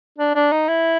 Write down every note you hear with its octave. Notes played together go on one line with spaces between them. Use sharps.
D4
D4
D#4
E4